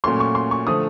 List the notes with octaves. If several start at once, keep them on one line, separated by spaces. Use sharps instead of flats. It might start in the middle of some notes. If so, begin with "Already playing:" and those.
A#2 F#3 A3 C#4 C6
C#6
C6
C#6
D3 F3 A3 D#6